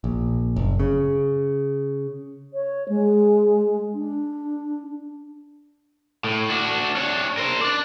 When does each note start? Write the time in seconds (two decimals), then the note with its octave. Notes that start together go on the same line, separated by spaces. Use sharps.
0.04 A#1
0.56 F#1
0.80 C#3
2.54 C#5
2.89 G#3
3.94 D4
6.24 A2
6.50 D4 F#4
6.96 D4 C#5
7.37 A#4 C5
7.61 D4 D5